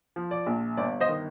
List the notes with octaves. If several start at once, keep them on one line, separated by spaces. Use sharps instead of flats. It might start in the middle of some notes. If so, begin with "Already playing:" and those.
F3
D5
A#1
G1 D5
C5 D#5
D#3